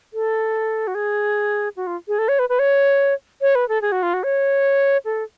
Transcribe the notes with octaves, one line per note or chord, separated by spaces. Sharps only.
A4
F#4
G#4
F#4
F4
G#4
A4
C#5
B4
B4
C#5
C#5
B4
A4
G#4
F#4
F4
F#4
C#5
A4